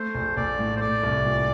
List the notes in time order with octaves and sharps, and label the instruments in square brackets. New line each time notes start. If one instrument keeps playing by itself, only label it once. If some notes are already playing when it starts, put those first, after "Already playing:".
Already playing: [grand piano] A3 [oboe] C5
[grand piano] A#1
[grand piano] A#1 [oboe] D5
[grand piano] A2
[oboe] C5
[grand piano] A3 [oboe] D5
[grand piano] C2
A#2